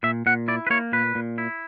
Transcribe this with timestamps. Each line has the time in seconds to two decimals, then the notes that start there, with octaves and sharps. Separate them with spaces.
0.03 A#2 E5
0.26 A#2 F#5
0.48 E4 D5
0.67 B4
0.70 A#3 C#5
0.92 A#2 B4
1.15 A#2
1.38 E4